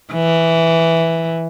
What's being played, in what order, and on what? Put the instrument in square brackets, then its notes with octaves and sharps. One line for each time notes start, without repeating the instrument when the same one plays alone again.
[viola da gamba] E3